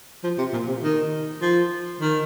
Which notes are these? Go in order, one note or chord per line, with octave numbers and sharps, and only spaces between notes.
F3
C3
A#2
C3
D#3
F3
D#3